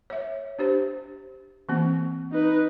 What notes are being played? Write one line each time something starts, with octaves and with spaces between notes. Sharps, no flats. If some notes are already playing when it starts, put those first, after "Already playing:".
C#5 E5
D4 G4 C5
E3 A#3 C4
D#4 B4